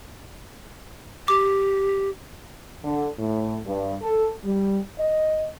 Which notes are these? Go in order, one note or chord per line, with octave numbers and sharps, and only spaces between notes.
G4 D6
D3
A2
G2
A4
G3
D#5